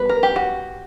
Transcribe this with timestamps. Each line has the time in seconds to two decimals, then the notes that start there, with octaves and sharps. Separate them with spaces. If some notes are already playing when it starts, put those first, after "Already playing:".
Already playing: G3 B3 B4
0.09 A#4
0.23 G4
0.36 F#4